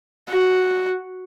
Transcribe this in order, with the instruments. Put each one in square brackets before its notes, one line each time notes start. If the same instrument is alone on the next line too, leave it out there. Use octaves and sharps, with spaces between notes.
[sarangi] F#4